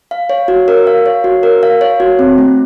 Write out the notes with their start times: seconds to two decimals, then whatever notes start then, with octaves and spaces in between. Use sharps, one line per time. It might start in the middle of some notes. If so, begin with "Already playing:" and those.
0.11 F5
0.30 C#5
0.48 F#4
0.68 A#4
0.87 F5
1.06 C#5
1.24 F#4
1.43 A#4
1.63 F5
1.81 C#5
2.00 F#4
2.19 C4
2.38 A3